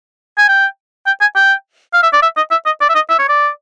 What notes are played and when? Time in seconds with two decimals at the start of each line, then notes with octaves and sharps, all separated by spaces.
0.38 G#5
0.48 G5
1.06 G5
1.21 G#5
1.36 G5
1.94 F5
2.03 E5
2.13 D5
2.22 E5
2.37 D#5
2.51 E5
2.66 D#5
2.81 D5
2.89 E5
2.95 D#5
3.10 E5
3.19 C#5
3.29 D5